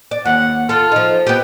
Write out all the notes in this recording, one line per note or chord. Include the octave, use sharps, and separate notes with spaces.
D5
D#2 F#5
F4 A4
F3 D#4
B3 G4 G5